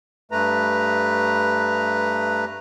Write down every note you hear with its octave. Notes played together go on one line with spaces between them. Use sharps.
G2 A3 B4 A#5